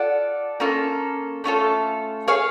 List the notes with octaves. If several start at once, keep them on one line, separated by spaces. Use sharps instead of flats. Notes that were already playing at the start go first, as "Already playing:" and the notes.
Already playing: F4 A4 D5 F#5
A#3 C#4 F4 A4
A3 C#4 F4 A4
G#4 C#5 F5 G#5